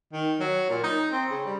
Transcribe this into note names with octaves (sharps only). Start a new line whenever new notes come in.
D#3
F#3
A#2
D#4
C4
C#3
G3